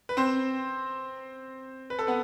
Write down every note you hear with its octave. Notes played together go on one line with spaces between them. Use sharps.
B4
C4 C5
B4
A4
B3 B4